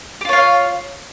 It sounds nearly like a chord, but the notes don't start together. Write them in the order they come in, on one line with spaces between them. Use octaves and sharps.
G4 F4 C#5 F5